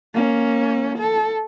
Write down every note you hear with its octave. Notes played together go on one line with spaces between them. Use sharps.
A#3 C#4
A4